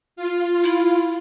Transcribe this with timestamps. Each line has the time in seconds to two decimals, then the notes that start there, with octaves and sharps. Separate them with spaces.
0.16 F4
0.64 E4